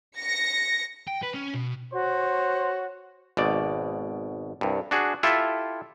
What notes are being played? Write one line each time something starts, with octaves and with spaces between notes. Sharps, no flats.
A#6 C#7
G5
B4
C#4
B2
F#4 C5 C#5
G#1 B2 D5
C2 G2
D4 F#4 G#4
E4 F4 G4 A4 E5